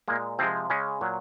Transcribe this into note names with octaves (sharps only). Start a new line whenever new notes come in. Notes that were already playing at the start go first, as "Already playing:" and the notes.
A#2 G#3 A#3
C3 F3 G#3 C4
C#3 G#3 C#4
A#2 F#3